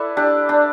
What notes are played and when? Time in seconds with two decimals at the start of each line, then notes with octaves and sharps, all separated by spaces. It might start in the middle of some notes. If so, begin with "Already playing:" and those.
Already playing: E4 A4 B4 D5
0.17 D4 G4
0.49 D4